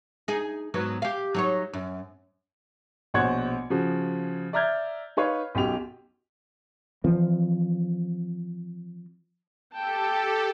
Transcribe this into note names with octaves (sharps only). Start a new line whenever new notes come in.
D#4 G#4
G#2 F#3 B3
G4 F5
F#3 D#4 C#5
F#2
A#1 B2 C5 C#5 F#5 G#6
C#3 F3 F#4
D5 E5 A#5 F6 G6 G#6
D#4 B4 C#5 F5
B1 F#2 G4 F7
E3 F3 C4
G4 A4 G5 A5